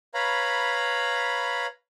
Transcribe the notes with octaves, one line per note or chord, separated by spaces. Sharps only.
B4 C#5 F5 A#5 B5